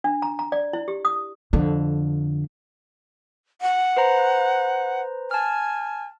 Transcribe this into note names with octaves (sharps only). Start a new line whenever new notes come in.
D4
A#5
A#5
D5
E4
G4
D#6
F2 D3
F#5
B4 C5 A#5
G#5 A5 F6